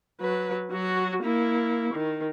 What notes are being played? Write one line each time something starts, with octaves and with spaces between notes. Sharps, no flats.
F#3 B4
F#3 F#4
A#3 E4
D#3